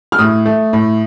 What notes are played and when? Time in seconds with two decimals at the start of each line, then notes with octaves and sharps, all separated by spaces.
0.12 F6
0.19 A2 D#6
0.46 A3
0.73 A2